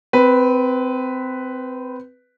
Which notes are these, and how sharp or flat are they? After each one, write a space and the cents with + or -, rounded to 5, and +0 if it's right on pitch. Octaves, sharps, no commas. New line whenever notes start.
C4 -20 B4 +0